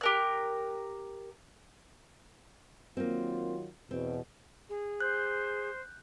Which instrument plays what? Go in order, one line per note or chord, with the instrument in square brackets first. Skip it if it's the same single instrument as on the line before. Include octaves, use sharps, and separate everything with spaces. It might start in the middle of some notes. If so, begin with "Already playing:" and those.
[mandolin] G4 A#4 F#6
[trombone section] D#3 F#3 F4 [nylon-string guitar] A#3 C4
[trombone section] E2 B2 [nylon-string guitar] C4
[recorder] G#4
[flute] C5 [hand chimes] F#6 G6